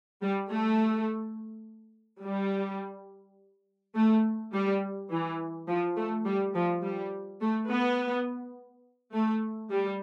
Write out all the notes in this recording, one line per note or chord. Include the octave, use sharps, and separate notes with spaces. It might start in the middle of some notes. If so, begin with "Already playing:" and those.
G3
A3
G3
A3
G3
E3
F3
A3
G3
F3
G3
A3
B3
A3
G3